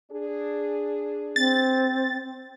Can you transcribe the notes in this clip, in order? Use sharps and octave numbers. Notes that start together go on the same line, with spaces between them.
D4 G#4
C4 A6